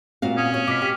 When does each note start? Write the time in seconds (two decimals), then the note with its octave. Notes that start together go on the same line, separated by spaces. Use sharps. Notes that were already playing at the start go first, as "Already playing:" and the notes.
0.22 A#2 C4 F#4 F5
0.37 C#4 D#6
0.54 C#5
0.67 B2 D6 F6 B6
0.82 G4